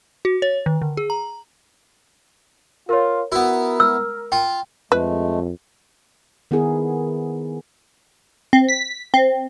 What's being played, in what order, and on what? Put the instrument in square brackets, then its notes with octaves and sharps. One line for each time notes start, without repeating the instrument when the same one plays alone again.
[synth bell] F#4
C#5
D#3
D3
G#4
A#5
[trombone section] F4 [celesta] A#4 C#5
[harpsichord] B3 E4 [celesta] F#4 [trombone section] A#4
[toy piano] E6 [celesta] F6
[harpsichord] F4 [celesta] G5
[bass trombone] F2 [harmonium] G#3 A3 [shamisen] B4
[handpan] D#3 B3 E4 G#4 A#4
[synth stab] C4
B6
C4